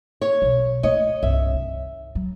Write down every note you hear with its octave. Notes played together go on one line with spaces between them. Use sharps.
C#5
B1
A3 C#5 D#5
C2 G2 E5
D#3
F#3